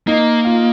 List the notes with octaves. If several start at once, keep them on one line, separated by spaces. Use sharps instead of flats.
A#3 D#4
F4